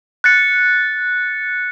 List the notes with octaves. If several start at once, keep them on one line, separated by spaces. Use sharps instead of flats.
F#6 A6 C#7